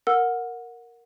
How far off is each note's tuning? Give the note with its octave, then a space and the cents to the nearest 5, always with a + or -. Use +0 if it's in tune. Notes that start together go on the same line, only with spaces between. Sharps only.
A#4 +0 F#5 -20 E6 +0